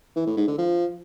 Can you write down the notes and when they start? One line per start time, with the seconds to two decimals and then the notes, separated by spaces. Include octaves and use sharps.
0.16 E3
0.27 A2
0.37 G#2
0.48 D3
0.58 F3